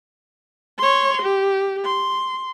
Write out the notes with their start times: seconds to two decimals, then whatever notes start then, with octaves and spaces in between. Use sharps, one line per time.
0.78 C#5 C6
1.22 G4
1.85 C6